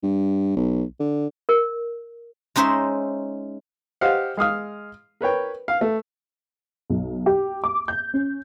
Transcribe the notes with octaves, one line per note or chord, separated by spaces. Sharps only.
G2
B1
D3
A#4
G#3 C#4 D#4 C5 E5
G4 C5 D#5 F5 F#5
G#3 F5 D#6 F6
A#4 B4 C#5 G5
F5
A3
B1
G4
D6
G6
C#4